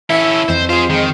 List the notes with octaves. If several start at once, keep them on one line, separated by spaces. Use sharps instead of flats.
C#4 E4 A4
F2 C4 B4 C5
F4 G#4 C5
D#3 G#3